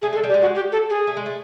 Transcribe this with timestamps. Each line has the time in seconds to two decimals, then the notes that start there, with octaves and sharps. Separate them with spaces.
0.02 A3 G#4
0.13 G#3 A4
0.23 G3
0.29 G4
0.34 G#3
0.42 F#4
0.55 G4
0.72 A4
0.89 G#4
1.07 A3
1.17 G#3
1.26 A3